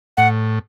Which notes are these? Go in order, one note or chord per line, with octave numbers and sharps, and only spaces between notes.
A2 F#5